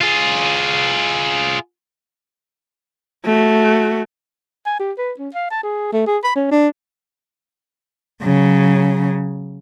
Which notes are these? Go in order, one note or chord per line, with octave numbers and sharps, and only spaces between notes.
F4 G#4
A3 F#4
G#5
G4
B4
C#4
F5
A5
G#4
A3
G#4
B5
C#4
D4
C#3 F#3